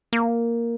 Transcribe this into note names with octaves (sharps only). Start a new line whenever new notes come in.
A#3